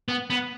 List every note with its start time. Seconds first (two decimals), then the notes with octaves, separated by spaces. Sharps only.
0.08 B3
0.30 B3